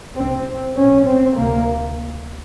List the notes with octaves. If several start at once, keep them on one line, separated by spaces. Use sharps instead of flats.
C2 C3 C4
B1 A2 C#4
C4
D2 C3 A#3